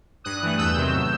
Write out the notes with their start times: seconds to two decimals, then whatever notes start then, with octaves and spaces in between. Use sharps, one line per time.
0.24 G2 D#6 F#6
0.42 E3 A3
0.58 E2 E6 G6
0.76 C3 D#3 F#3
0.92 A2